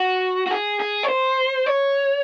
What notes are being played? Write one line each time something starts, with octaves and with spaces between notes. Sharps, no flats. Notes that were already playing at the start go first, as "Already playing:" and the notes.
Already playing: F#4
F#4
G#4
G#4
C#5
C5
C#5